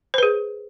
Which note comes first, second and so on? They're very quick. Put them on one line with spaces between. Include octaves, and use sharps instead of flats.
C5 B4 G#4